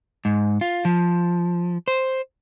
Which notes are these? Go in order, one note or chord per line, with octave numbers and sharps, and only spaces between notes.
G#2
F4
F3
C5